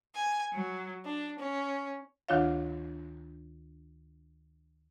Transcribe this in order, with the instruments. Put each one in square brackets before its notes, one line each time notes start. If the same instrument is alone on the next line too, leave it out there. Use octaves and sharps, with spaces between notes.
[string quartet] G#5
F#3
D4
C#4
[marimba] D2 D#3 D4 F4 C#5 F5